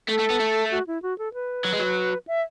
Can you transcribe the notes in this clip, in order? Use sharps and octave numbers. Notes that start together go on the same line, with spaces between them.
A3 A4
A3
B3
A3
F#4
E4
F#4
A4
B4
F#3
G#3
F#3
E5